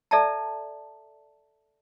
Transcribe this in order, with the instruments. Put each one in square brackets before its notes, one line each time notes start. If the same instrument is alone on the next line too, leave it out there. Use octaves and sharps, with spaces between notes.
[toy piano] A4 D5 E5 A5 A#5